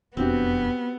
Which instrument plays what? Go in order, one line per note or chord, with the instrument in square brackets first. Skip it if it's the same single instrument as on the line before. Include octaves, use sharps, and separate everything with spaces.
[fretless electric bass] E1 F2 D4 [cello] B3 [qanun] C4 F#4 G4